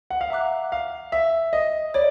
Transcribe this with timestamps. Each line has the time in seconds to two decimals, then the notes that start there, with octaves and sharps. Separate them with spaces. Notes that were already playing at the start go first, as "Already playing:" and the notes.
0.10 F#5
0.21 F5
0.30 E5 F#5 A#5 D6 F#6
0.72 F5
1.12 E5
1.53 D#5
1.94 C#5 D5